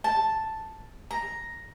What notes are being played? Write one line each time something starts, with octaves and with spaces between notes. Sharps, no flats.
A5
A#5